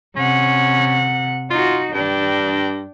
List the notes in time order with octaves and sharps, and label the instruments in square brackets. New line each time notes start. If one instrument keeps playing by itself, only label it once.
[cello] C3 F#5 [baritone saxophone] C#4
[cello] D#4 F#4 [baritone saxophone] F4
[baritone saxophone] G2 [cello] D4 G5